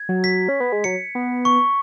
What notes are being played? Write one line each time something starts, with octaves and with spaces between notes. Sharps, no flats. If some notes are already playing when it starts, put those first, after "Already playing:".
Already playing: G#6
F#3
B6
C#4
B3
G#3
F#3 C#7
B3
C#6